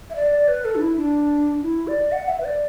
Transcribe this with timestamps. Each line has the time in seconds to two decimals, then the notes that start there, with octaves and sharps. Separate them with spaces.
0.10 E5
0.16 D5
0.31 D5
0.48 B4
0.65 A4
0.75 D4
0.81 E4
0.97 D4
1.63 E4
1.88 D5
2.12 F#5
2.29 E5
2.41 B4
2.45 D5